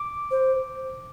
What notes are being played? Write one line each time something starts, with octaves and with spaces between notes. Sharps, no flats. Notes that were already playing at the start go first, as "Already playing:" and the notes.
Already playing: D6
C5